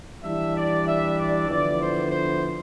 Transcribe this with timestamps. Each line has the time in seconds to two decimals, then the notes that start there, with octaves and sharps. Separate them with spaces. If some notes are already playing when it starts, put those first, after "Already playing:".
0.23 E3 G3 D4 E5
0.56 D5
0.86 E5
1.17 D5
1.48 D3 F3 B3 E4 D5
1.79 C5
2.10 C5